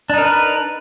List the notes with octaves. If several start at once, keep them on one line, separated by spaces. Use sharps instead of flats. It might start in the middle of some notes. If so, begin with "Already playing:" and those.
D4 D#4 A#4 B4